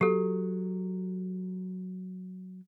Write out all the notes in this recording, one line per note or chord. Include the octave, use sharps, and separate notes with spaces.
F#3 G4 A4